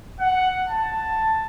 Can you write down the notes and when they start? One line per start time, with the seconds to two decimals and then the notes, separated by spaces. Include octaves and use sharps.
0.20 F#5
0.67 A5